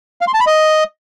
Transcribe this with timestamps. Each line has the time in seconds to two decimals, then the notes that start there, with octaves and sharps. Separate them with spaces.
0.21 F5
0.27 C6
0.34 A5
0.40 B5
0.47 D#5